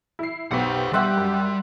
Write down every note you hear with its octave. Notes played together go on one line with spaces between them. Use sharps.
E4 C7
B1 B3 G4 C5 F#5
G3 G4 E5 F#5 C6
F#2